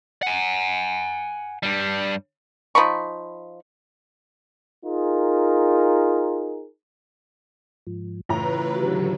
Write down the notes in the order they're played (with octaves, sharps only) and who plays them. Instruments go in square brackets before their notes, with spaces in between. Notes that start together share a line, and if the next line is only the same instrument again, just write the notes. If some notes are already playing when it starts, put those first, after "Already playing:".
[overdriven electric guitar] F#5 G#5
G2 G3
[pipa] F3 D#4 B5 C#6
[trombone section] D#4 F4 G#4 A#4
[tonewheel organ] G#2 F3
[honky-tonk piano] A2 A#5 [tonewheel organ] C#3 E3 F4 [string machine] B4
[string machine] D3 F#3 [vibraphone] F#4 G4